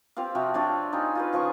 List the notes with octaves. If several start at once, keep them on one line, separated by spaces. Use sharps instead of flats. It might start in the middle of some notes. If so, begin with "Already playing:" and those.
C4 F4 G4 F5
C3 F3 F#4
C4 D4 F4 C#5
D#4 F4 G#4
F4 G#4 B4
C#3 F3 G#4 C#6